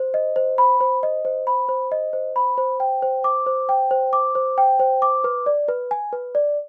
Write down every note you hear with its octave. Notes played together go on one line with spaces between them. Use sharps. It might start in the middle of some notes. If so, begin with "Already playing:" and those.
Already playing: C5
D#5
C5
B5
C5
D#5
C5
B5
C5
D#5
C5
B5
C5
G5
C5
D6
C5
G5
C5
D6
C5
G5
C5
D6
B4
D5
B4
G#5
B4
D5